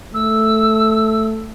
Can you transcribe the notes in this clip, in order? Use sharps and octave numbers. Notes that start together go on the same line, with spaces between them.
A3 E6